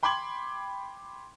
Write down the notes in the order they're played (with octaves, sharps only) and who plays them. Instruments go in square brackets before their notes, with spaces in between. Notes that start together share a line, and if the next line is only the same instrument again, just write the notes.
[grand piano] G5 B5 C6 D6 G#6 F#7